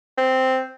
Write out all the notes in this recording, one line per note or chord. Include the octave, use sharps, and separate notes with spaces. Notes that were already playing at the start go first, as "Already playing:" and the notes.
C4